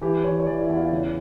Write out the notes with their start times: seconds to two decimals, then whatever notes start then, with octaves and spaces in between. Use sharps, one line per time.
0.01 E3 G4
0.24 E3 C#5
0.40 C#5
0.46 E3 D5
0.61 E4
0.69 E2
0.77 F4
0.92 C#3